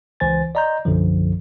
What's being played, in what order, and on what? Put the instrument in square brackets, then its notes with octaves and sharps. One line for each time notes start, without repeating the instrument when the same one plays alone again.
[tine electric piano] C#2 E3 C5 G#5 A6
D5 D#5 A#5 C6 G6
B1 F#2 D3 F3